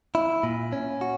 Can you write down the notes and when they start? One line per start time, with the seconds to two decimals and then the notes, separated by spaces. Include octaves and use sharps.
0.15 E4
0.43 A#2
0.73 C#4
1.01 F#4